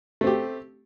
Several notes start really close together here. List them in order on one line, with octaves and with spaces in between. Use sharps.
A3 C4 G4